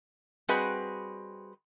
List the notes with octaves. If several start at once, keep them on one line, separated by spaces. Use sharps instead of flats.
G3 C4 F#4 G#4 B4 D#5